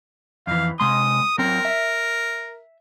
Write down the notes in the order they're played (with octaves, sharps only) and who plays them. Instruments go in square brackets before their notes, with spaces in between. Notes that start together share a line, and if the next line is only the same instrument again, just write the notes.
[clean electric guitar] F2 E3 [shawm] F5
[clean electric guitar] C3 G#3 C6 [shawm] D#6
[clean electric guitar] F#3 C4 [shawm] A#4
[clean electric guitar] E5